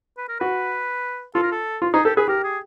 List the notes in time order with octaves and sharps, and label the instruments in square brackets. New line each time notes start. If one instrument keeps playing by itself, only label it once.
[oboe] B4
A#4
[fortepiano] F#4 [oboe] B4
[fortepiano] F4 [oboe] A4
[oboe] A#4
A4
[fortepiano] F4
[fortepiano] D#4 [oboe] G#4
[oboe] G4 [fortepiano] A4
[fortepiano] G#4 [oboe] B4
[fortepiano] G4 [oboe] A#4
[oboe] G#4